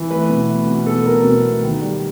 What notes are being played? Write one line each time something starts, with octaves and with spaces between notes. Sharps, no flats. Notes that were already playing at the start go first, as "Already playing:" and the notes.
Already playing: E3
A3 B4
B2
A3
B2
B2 A4
F#3 A#4
B2
A3
D#3
G3